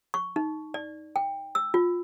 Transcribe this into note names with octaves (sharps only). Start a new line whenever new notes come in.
C#6
D#4
D5
G5
E6
F4